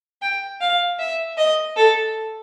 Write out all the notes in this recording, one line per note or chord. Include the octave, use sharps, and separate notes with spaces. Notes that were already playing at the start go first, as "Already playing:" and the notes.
G5
F5
E5
D#5
A4